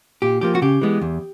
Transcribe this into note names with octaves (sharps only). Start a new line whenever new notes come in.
A#2 G4
F3 A#3 G4
F#4
C#3 G4
E3 G#3 B3
E2